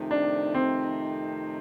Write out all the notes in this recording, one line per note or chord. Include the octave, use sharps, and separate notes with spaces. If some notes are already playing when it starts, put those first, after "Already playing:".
Already playing: F2 C3 D#3 A3 D#4
D4
C4